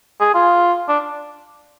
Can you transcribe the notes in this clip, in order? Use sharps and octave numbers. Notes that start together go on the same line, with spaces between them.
G#4
F4
D4